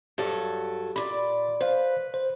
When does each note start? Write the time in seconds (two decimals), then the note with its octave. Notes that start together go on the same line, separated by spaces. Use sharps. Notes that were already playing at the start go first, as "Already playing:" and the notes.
0.18 G2 F#3 A4
0.96 A#2 D5 B5
1.61 B4 C5 F5
2.14 C5